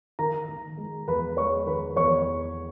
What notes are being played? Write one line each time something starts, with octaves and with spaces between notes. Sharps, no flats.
D#3 A#4 A#5
D#3
G#3
E2 B4 B5
G#3 C#5 C#6
D#3 B4 B5
E2 C#5 C#6